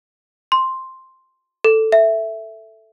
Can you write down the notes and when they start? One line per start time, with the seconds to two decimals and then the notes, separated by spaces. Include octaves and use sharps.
0.52 C6
1.64 A4
1.92 E5